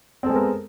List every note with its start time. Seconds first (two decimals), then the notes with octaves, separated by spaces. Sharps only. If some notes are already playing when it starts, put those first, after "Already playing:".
0.23 C4
0.26 A4
0.29 G#3
0.32 B3
0.36 A#4